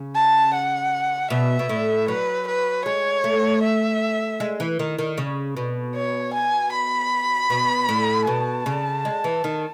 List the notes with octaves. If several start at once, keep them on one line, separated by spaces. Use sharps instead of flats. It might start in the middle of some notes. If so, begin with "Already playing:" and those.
Already playing: C#3
A5
F#5
B2 E5
B2
A2
F#3 B4
B4
G#3 C#5
A3
E5
G#3
E3
D#3
D#3
C#3
B2
C#5
G#5
B5
B2
A2
B2 A5
C#3
G#3
E3
D#3